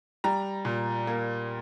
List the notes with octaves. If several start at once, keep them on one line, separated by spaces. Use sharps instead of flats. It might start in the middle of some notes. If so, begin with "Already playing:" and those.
G3 A#5
A#2
A#3